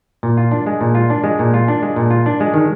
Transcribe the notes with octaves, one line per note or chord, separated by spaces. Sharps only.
A#2
F4
D4
G#3
A#2
F4
D4
G#3
A#2
F4
D4
G#3
A#2
F4
D4
G#3
D#3